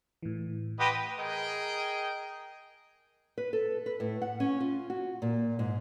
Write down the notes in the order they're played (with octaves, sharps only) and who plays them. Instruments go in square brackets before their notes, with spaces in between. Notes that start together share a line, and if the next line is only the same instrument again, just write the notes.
[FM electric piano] A2 E3
[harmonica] G4 B4 D#5 [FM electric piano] F#5 C6
[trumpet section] G#4 A#4 D#5 G5
[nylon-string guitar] B4
A4
B4
A2
F#5
C#4
F4
F#4
A#2
G#2